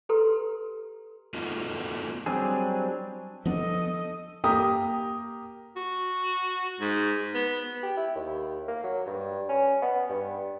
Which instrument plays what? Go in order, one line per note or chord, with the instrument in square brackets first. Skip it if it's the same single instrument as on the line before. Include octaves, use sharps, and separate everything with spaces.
[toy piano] G4 A4 B4 A#5 C6
[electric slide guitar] A3 B3 D#4 F4 F#4
[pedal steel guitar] F#3 G3 C4 D4 G#4
[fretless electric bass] F3 B3 D4 [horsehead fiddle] A4 D#5
[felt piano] A#3 G4 A#5 D#6
[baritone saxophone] F#4
G#2
B3
[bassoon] G4
E4
D#2
A#3
F#3
G2
C#4
B3
G2